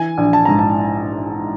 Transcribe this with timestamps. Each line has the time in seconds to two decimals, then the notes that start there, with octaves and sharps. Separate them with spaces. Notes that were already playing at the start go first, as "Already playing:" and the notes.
Already playing: E3 G#5
0.18 A#1
0.33 A5
0.45 G#2 A#5
0.59 A5